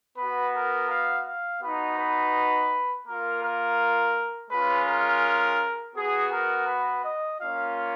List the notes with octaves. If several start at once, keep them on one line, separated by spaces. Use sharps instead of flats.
B3 F#4 B4
A#4
F5
F5
B3 D#4 F#4 B4
B4
A#3 F4 A#4
A#4
G#3 C#4 F4 B4
A#4
B3 F#4 G#4
A#4
B4
D#5
A#3 C#4 F4 F5